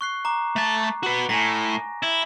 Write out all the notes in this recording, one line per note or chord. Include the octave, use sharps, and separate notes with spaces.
C#6 F#6 C7
A#5 D6
A3 A5
F#4 B4
A2 G#5 A#5 A#6
E4